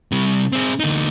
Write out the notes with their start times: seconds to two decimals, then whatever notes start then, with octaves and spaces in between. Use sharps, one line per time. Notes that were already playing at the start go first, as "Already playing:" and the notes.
0.12 C3 G3
0.53 C4 G#4
0.80 D2 D#4